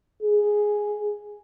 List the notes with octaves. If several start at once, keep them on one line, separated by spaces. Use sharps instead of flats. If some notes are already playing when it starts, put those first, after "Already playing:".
G#4